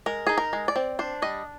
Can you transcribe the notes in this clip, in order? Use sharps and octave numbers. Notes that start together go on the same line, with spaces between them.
G#3 A#4
D#4 G#4
A#4
G#3
D5
C4
D4 C5
G3 D#5